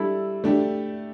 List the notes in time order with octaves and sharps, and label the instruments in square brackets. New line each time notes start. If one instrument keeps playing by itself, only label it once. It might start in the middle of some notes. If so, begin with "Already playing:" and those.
Already playing: [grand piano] G3 D4 A4 [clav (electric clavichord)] E4
[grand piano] A3 D4 G4